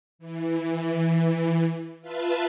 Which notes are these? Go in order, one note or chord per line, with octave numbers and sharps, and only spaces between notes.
E3
F4 B4 E5 A5